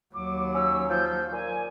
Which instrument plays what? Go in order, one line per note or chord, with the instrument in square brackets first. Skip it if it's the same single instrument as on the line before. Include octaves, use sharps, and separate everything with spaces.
[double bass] D#2 F#3 [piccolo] D6
[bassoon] C#4 [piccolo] E6
[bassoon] F3 [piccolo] G6
[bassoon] A#2 [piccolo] G#5